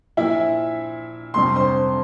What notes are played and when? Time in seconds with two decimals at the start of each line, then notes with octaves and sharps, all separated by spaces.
0.17 A#2 F3 E4 E5
1.34 F2 C3 G3 C6
1.56 C5 C6